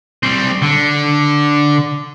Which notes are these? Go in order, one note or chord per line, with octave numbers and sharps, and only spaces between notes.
G3 C4
D3